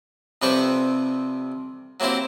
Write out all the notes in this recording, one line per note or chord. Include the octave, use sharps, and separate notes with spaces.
F2 C3 G3 B4 C5 C#6
F#3 A#3 C4 E4 G4